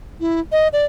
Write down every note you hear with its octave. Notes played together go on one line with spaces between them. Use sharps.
E4
D#5
D5